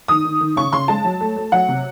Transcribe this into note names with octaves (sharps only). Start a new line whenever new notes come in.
D#3 D#6
D#3
D#3
C#3 C#6
C#3 C6
G#3 A5
F#3
A3
A3
F#3 F#5
C3